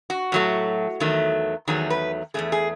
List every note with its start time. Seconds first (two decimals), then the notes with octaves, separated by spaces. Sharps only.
0.10 F#4
0.32 A2 F#3 A3
1.00 E2 D#3 F#3 A3
1.68 E2 D#3 F#3 A3 G#4
1.90 B4
2.34 E2 B2 A3 G#4
2.52 G#4